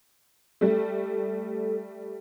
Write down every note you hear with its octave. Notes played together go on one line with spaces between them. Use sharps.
G3 A3 A4